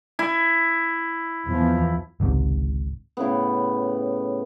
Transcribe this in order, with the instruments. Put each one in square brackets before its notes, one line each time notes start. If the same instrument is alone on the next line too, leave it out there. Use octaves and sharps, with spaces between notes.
[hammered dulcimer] E4
[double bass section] E2 F3
[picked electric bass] G#1 C#2 G#2 C3
[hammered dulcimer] A2 C#3 B3